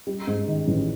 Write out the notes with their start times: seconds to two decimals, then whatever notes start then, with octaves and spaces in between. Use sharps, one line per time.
0.07 G3
0.27 G#2
0.48 D#3
0.68 A1